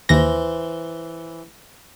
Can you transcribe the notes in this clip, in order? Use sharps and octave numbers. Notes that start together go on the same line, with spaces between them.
D#2 E3 C5 A#6